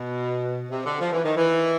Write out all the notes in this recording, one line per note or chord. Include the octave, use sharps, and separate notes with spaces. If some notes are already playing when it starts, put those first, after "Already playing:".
Already playing: B2
C3
D3
F3
E3
D#3
E3